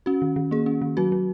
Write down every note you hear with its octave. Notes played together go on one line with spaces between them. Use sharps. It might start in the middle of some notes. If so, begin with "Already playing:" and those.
C#4 F#4
D#3
D#3
A#3 G#4
C#4
D#3
F#3 F#4
F#3